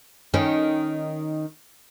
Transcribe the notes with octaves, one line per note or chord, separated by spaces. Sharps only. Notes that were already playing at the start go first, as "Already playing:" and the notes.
D#3 C#4